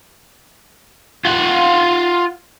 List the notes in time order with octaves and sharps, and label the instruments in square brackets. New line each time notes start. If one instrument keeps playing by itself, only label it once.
[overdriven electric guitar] F4 F#5